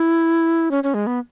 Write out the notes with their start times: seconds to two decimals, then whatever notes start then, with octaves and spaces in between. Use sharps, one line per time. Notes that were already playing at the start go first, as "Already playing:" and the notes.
Already playing: E4
0.71 C#4
0.84 C#4
0.94 G#3
1.07 B3